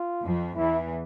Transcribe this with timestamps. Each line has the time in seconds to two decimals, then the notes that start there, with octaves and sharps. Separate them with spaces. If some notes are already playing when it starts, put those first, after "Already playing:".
Already playing: F4
0.24 F2 F3
0.56 E2 E3 E4